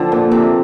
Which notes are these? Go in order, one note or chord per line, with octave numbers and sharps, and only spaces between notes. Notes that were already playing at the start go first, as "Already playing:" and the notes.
Already playing: D3 F3 C4
A#2
C3